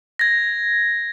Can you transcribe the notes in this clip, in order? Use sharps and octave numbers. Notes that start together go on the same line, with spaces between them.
G#6 A#6